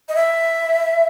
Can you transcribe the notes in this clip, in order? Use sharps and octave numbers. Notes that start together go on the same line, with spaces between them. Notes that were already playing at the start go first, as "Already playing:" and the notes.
D#5
E5